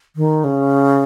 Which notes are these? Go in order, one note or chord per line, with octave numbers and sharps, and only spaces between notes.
D#3
C#3